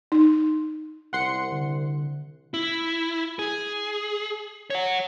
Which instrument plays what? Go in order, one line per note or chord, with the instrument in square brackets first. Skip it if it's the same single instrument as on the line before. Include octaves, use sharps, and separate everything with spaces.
[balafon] D#4
[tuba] C2 [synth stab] F#5 C6 C#7
[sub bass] D3
[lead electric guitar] E4
G#4
C#5 F#5